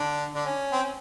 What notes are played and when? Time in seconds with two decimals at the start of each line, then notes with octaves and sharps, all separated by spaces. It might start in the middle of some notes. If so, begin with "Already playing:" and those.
Already playing: D3 D4
0.34 D3 D4
0.46 C#4
0.72 C4
0.83 C#4